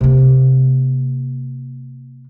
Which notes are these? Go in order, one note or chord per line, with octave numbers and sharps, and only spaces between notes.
C3 A#3